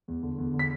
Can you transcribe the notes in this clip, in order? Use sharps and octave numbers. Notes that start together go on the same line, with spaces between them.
E2
D3
E2
D3
B6